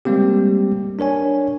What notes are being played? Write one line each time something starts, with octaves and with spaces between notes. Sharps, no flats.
G3 G#3 A#3 C4 G4
D4 A#4 C#5 G#5